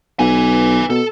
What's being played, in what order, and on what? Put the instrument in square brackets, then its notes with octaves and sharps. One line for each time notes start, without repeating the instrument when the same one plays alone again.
[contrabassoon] B1 [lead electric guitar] B4 G#5
[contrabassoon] B2 [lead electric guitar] A4